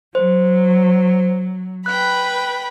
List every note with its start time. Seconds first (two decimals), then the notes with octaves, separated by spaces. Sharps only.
0.15 F#3 C5
1.86 B4 G5 B5 F#6